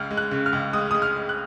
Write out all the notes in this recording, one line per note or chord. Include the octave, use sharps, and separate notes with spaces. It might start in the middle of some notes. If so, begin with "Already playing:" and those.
Already playing: C#2 F6
G#3
F#6
C#3
F6
C#2
G#3 D#6
G#3 D#6
F6
G#3
F#6